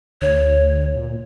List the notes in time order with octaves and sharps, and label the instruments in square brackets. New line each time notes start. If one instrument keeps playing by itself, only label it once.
[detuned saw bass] D2 [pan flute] C#5
[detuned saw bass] A#2